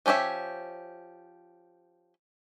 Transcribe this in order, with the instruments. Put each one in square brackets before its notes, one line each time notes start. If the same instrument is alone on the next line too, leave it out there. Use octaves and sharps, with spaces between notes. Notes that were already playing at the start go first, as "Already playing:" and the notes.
[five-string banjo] F3 C#4 G4 C#5 E5